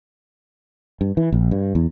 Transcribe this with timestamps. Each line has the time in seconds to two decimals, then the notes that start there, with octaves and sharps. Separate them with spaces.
1.01 G2
1.17 E3
1.32 A#1
1.51 G2
1.75 E2